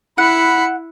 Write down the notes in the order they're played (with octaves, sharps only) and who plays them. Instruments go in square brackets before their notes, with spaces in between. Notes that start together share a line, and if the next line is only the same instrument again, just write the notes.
[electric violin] E4 C#7 [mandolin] F#5 [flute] B5